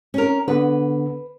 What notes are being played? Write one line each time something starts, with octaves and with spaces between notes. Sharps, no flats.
C#4 A#4
D3 B3 B4